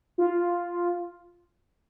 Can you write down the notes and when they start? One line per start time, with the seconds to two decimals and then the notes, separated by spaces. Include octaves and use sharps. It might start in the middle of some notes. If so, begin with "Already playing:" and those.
0.18 F4